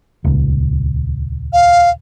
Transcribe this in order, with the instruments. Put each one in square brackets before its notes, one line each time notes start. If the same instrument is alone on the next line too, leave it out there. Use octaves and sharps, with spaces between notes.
[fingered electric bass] D#1 C#2
[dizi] F5